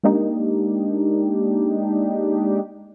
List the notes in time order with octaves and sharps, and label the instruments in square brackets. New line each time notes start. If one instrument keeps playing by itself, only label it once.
[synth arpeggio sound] G#3 A#3 D4 D#4 G4